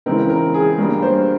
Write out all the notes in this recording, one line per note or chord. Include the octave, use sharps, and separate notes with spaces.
C#3 E3 G#3 C4 A#4
A#4
G#4
G2 G3 A#3 A#4
C5